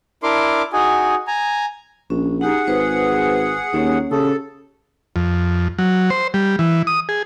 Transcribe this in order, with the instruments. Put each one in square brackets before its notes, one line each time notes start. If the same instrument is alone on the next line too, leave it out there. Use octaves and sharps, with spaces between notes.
[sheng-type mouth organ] D4 E4 A#4 C6 D6
D#4 F#4 G#4 G#5
G#5 A#5
[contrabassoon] A#1 [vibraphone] C#4
[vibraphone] D#4 G4 A#5 [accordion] G#4 F#5
[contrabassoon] G#1 [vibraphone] B4 C5
[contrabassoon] D#2 [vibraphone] A#3 C#4 C#5
[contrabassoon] C#3 [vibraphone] G4 D#6 [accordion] A4
[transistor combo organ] F2
F#3
C5
G3
E3
D#6
G#4